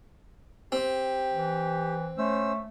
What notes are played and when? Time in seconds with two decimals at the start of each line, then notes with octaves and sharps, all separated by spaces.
0.72 C4 G4
1.34 E3
2.18 A3 C#4 C5 E6